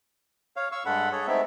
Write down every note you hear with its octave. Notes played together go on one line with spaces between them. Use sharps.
C#5 F5
F5 C#6 E6
G2 G#3 A4 F#5 B5
G#4 A4 C#5
G#3 A3 B3 C4 D#4 E5